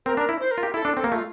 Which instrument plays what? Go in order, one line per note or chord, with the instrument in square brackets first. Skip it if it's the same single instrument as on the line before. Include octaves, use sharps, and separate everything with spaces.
[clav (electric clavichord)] C4 [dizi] A#4
[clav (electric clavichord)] D4 [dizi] A#4
[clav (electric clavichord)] E4
[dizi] C5
A#4
[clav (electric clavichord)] F4
G4
[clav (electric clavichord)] E4 [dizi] A4
[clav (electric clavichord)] D4
[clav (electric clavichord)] C4 [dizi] A4
[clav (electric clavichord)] A#3
[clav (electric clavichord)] A3 [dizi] F4